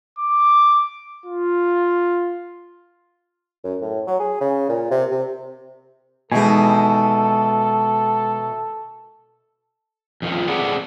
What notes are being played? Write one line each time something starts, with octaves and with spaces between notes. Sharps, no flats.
D6
F4
F#2
A2
F#3
G#4
C#3
A#2
C3
C3
B2 D#3 E3 G#3 D#4 A4 G#5
F2 D#3 F3
C4 G#4 A4 B4 D5 F#5